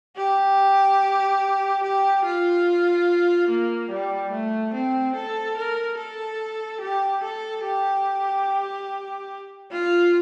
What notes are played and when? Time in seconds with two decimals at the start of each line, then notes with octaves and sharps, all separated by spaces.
0.17 G4
1.83 G4
2.25 F4
3.49 A#3
3.90 G3
4.32 A3
4.74 C4
5.16 A4
5.57 A#4
5.98 A4
6.81 G4
7.23 A4
7.64 G4
9.71 F4